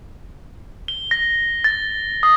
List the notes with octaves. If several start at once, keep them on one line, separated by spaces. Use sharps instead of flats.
G7
A#6
A6
D#6